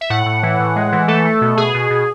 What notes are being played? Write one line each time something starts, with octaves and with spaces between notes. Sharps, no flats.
E5
A2 F#5
A2
E3
A2
G#3
E3
A3 A4
A3
B2
B2 G#4
B2
B2